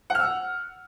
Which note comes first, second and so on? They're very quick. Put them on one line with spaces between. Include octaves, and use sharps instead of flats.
F#5 F6 E6